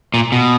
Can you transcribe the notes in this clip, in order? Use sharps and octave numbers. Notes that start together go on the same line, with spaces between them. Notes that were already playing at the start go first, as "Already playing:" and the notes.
A#2
B2